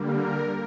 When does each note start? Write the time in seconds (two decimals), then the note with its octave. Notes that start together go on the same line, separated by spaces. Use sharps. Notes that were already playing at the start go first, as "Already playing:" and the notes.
Already playing: D3 G3 A#3
0.11 A#4